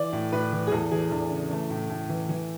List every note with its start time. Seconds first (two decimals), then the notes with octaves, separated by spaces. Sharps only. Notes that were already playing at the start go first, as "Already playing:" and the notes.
Already playing: E3 D5
0.13 A2
0.32 A2 B4
0.52 E3
0.67 G#4
0.72 E2 A4
0.91 E3 G#4
1.11 E2 D4
1.31 C#3
1.50 E3 A3
1.70 A2
1.90 A2
2.09 E3
2.29 E3